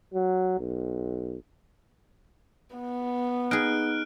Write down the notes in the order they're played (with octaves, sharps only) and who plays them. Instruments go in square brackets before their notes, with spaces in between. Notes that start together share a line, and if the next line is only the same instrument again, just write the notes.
[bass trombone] F#3
B1
[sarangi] B3
[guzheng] D#4 G#4 [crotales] F6 F#6 D7